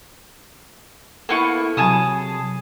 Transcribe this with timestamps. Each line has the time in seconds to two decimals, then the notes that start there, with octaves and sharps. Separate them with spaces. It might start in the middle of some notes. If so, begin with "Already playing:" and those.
1.29 A#3 B3 E4 A4 C#6
1.77 C3 F#3 G#4 A5 D#6